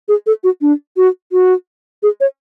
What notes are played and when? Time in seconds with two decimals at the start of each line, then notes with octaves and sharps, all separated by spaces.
0.08 G#4
0.27 A4
0.44 F#4
0.61 D4
0.97 F#4
1.32 F#4
2.03 G#4
2.21 C#5